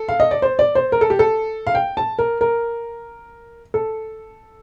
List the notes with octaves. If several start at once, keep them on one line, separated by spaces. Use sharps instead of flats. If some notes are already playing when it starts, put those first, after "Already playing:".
Already playing: A4
F5
D#5
D5
C5
D5
C5
A#4
A4
G4
A4
F5
G5
A5
A#4
A#4
A4